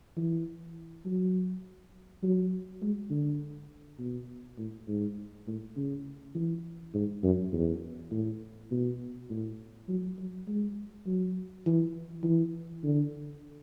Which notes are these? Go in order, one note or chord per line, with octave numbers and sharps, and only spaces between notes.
E3
F#3
F#3
G#3
D3
B2
A2
G#2
A2
C#3
E3
G#2
F#2
E2
A2
B2
A2
F#3
F#3
G#3
F#3
E3
E3
D3